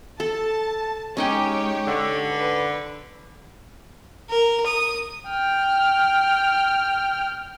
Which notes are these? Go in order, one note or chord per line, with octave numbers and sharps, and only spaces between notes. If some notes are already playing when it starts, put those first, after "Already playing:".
A4 A5
G#3 C#4 D#4 G4 C#5 G5
D3
B4
A#4
D#6
G5 F6